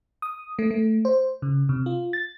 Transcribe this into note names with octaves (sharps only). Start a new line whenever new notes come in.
D#6
A3
A3
C5
C#3
C3
F4
A6